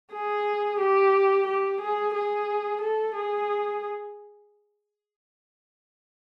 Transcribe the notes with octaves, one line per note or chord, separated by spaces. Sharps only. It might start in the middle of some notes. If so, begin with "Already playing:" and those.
G#4
G4
G4
G#4
G#4
A4
G#4